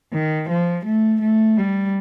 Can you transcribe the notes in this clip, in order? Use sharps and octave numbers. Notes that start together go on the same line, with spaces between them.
D#3
F3
A3
A3
G3